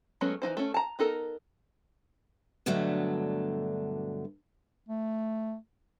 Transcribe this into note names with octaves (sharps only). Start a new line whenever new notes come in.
F#3 G#3 A3 B3 C#4
E3 A3 D#4 C5
A3 C#4
A5 A#5
B3 D#4 A4 A#4
G2 B2 D3 F#3 A3 D4
A3